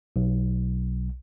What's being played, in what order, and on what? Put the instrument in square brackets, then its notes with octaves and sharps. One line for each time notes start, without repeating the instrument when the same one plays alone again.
[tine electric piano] B1